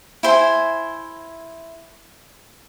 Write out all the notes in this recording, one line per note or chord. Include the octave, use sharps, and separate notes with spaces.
E4 C5 G#5